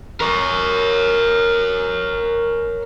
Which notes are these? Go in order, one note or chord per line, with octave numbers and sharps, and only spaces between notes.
A#4 C#5